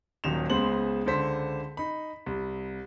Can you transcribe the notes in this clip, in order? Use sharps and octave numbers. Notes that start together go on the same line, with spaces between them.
D#1 A#2 D#3 F#3 E7 F7
C#2 G#3 B3 C5 F#7
C#2 D3 C5 B6
D#4 B5
C2